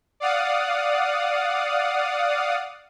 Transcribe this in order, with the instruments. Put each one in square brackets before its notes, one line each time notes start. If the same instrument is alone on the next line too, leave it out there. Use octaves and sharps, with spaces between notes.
[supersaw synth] D5 F5 F#5 D#6